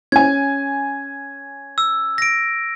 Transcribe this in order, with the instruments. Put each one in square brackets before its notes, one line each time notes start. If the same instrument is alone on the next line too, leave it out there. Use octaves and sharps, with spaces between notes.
[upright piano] C#4 G#5 [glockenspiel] G#6
[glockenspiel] E6
A#6 D7